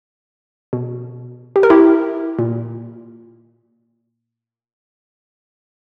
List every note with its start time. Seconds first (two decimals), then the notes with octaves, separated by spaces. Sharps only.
0.73 B2
1.56 G4
1.63 A#4
1.70 E4 G4
2.39 A#2